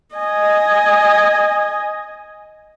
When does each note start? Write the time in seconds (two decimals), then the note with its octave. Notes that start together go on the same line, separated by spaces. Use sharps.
0.15 D#5 G#5